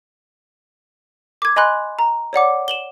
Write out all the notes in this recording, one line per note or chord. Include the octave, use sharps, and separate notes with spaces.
D6 G#6
D#5 G#5 B5 C6 F#6
A#5
C#5 D5 F#5 D6
E7 F#7 G7